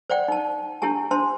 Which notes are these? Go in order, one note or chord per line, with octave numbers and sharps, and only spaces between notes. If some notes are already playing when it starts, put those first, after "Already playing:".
C5 D5 F#5 G5
D#4 A5
D4 E4 G4 G#5 A5
D4 C5 A5 C6